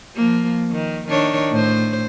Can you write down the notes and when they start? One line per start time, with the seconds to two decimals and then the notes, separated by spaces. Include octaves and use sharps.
0.16 F3 A#3
0.71 D#3
1.07 D#3 D4 C#5
1.51 A2 C5